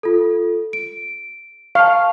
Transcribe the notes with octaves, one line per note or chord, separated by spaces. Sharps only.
F4 A4
D7
F5 A5 C#6